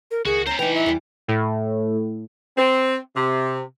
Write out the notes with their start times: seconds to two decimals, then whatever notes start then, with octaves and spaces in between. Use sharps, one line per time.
0.11 A#4
0.25 C#2 D#3 F#4 G#4
0.46 B3 C#4 C5 A#5
0.59 E3 B3 D#4 B4 G5 A#5
0.75 E5
0.86 E2 E3 G3
1.28 A2
2.57 C4
3.15 C3